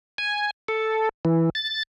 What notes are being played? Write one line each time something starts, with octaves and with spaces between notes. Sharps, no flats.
G#5
A4
E3
A6